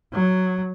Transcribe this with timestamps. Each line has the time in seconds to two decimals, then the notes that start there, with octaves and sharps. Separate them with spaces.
0.13 F#3